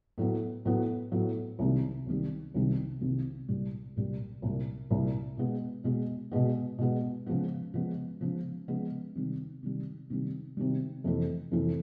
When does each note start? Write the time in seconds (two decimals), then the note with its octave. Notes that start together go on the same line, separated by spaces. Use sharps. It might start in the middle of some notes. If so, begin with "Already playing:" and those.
0.18 A2 F#3 B3
0.65 A2 F#3 B3
1.12 A2 F#3 B3
1.59 C2 C3 D#3 G3
2.06 C2 C3 D#3 G3
2.54 C2 C3 D#3 G3
3.01 C2 C3 D#3 G3
3.49 C2 A#2 G3
3.96 C2 A#2 G3
4.42 C2 A#2 G3
4.90 C2 A#2 G3
5.37 B2 G#3 B3
5.84 B2 G#3 B3
6.31 B2 G#3 B3
6.78 B2 G#3 B3
7.26 C#3 F3 G#3 B3
7.74 C#3 F3 G#3 B3
8.21 C#3 F3 G#3 B3
8.68 C#3 F3 G#3 B3
9.16 C3 D#3 G3
9.63 C3 D#3 G3
10.10 C3 D#3 G3
10.57 C3 D#3 G3
11.04 F2 C3 E3 A3
11.51 F2 C3 E3 A3